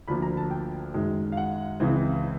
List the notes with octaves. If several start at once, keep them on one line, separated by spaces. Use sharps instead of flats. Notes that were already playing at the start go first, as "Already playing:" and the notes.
D2 D3 F3 A#3 B5
A#5
A5
G5
F#2 D#3 G#3
F5
F#5
C#2 C#3 E3 G#3 C4